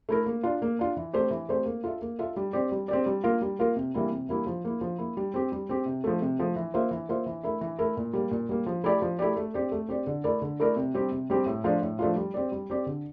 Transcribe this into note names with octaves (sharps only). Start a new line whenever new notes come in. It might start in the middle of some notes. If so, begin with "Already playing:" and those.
A3 E4 A#4
A#3
D4 F4
A#3
D4 F4
E3
A3 C4 G4 C5
E3
A3 C4 G4 C5
A#3
F4 A4 E5
A#3
F4 A4 E5
G3
C4 G4 D5
G3
C4 G4 D5
G3
A#3 F4 A#4
G3
A#3 F4 A#4
C3
E3 G3 A#3 E4
C3
E3 G3 A#3 E4
F3
A#3 E4
F3
A#3 E4
G3
C4 G4
G3
C4 G4
C3
F3 A3
C3
F3 A3
E3
A#3 F4 C5 E5
E3
A#3 F4 C5 E5
E3
A3 E4 A#4 E5
E3
A3 E4 A#4 E5
A#2
G3 A#3
A#2
G3 A#3
F3
A3 E4 G4 D5
F3
A3 E4 G4 D5
A3
C4 G4 D5
A3
C4 G4 D5
D3
A3 E4 A#4 D5
D3
A3 E4 A#4 D5
C3
G3 C4 G4
C3
G3 C4 G4
A2
F3 A3 D4 F4
A2
F3 A3 D4 F4
G3
C4 G4 D5
G3
C4 G4 D5
D3